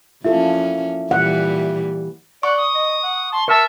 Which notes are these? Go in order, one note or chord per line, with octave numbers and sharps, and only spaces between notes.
F2 A#3 C#4 E4 F4 A4 E5
A#2 E3 G3 F#5
D5 F#5 C#6
D#6
D#5
F#5
A5 C6
A#4 E5 A5 C#6